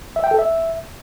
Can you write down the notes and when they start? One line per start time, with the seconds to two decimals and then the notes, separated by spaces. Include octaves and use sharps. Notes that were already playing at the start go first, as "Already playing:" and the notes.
0.16 E5
0.24 G5
0.31 A4
0.39 E5